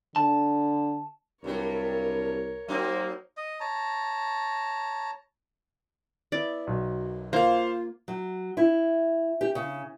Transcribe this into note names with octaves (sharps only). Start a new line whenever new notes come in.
D3 A5
C2 G2 F#3 G3 A#4 C#5
F#3 A#3 C4 D#4
D#5
C#5 A5 A#5
B3 E4 D5
B1 F#2
A#3 F4 C5 F5
F#3
E4
G4
C#3